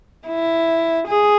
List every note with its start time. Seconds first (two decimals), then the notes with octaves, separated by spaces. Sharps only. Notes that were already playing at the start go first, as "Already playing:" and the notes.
0.27 E4
1.07 G#4